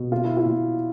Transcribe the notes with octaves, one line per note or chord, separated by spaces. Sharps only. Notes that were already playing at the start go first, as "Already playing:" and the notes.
Already playing: B2
A#2 F4
E4
F4
A#2